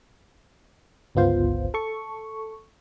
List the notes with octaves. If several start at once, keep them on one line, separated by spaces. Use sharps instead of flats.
G1 C#2 B3 F4 C5
A4 C#6